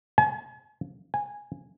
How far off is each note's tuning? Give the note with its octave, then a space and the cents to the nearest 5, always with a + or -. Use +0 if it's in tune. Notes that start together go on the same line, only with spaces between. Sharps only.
G#5 +40
G#5 -10